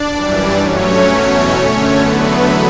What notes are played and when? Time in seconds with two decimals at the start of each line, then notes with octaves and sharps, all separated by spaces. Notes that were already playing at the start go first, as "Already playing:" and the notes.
Already playing: D4 D5
0.10 F#2 E3 G3
0.58 G2 F#3 A3 C#4 C#5
1.06 E2 B2 F#3 A3
1.53 F#2 D3 A3
2.01 E2 D3 F#3 A3 B3 B4